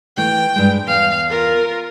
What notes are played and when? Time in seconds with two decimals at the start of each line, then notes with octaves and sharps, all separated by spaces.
0.17 E3 A3 G5
0.56 G2 G#3
0.87 E2 F5
1.29 F4 A#4